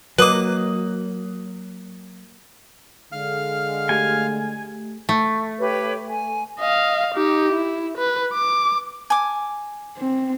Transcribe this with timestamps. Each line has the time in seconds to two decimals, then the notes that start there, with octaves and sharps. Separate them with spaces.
0.18 F#3 A#3 B4 D#5 D6 D#6 F#6 F#7
3.12 D3 G#3 F5 F6
3.89 A3 G4 G#5
5.09 A3
5.58 G4 B4 C#5
6.09 G#5
6.59 D#5 F5
7.14 D#4 G4
7.52 E4
7.97 B4
8.34 D6
9.10 G#5 D6
9.98 C4